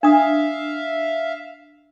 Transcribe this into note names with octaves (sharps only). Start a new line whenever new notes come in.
D4 E5 F5 D#6